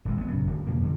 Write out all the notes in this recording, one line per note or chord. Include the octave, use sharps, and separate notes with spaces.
D#1 F2 G#3
A1 B3
A#1 F#2 C#3
D1 D2
E2 B2 F3 A#3
F2 D3 E3